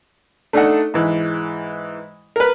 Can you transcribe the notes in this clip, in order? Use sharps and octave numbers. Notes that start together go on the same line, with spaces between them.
A3 D4 D#4 A4 D#5 F#5
G#2 E3
A#4 B4